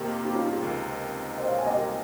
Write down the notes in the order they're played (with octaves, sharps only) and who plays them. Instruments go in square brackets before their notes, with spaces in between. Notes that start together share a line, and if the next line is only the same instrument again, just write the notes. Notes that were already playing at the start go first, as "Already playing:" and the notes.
Already playing: [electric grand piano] F2 C3 D#3 A#3 [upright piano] G4 A#4
[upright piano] D#4 G4
C#4 F4
D#4 G4
F4 G#4
[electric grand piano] C#2 C3 D#3
[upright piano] C5 D#5
C#5 F5
G#5
D#5 G5
G4 A#4